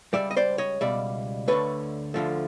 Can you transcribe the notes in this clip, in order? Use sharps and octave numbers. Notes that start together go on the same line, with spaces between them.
C#2 B2 G3 D5 E5
D#5
C5 D5
C#5 D#5
C#2 B2 G3 D5 E5
D2 D3 F3 A3 B4 C#5
D2 D3 F3 A3